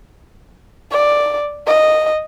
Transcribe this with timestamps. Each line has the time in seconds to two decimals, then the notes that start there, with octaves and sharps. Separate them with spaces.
0.91 D5
1.67 D#5